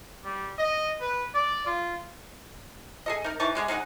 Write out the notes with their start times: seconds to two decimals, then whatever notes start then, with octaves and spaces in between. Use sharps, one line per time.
0.24 G3
0.59 D#5
1.01 B4
1.34 D5
1.66 F4
3.06 G#4 A4 D#5
3.24 D#4 A#4
3.40 E3 D#4 A5 C#6
3.55 D3 G#3 G#4
3.68 G#3 D#4 A#4 F#5